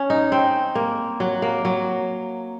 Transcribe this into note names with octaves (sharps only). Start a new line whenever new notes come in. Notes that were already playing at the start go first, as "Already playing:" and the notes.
Already playing: C#4
D#4
C4
A#3
F#3
A#3
F#3